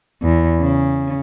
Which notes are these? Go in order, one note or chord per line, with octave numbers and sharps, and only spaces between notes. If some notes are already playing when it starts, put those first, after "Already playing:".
E2
C#3